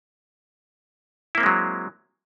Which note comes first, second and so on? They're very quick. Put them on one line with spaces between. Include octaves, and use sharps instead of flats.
E4 A#3 C4 G#3 F#3